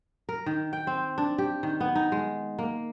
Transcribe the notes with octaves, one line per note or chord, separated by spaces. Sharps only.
A#4
D#3
G5
C4
D4
G4
D#3
B3
D#4
G#3
A#3